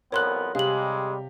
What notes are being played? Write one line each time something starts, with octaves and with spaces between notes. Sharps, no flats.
C2 F2 B3 A#4 C#5 C6 F#6 F#7
C3 G3 G#3 G4 F5 F#7